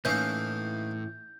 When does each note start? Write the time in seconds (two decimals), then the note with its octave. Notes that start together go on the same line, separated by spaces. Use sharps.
0.05 A2 E3 A#3 C#4 D#4 F5 G6